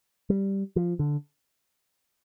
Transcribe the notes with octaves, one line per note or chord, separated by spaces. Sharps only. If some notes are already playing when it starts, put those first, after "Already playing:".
G3
F3
D3